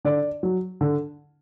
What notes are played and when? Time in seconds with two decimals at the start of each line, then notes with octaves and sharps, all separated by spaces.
0.05 D3 D5
0.43 F#3
0.81 D3